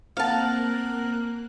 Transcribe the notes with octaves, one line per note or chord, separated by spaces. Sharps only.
A#3 C4 A#4 F5 F#5 A5 F#6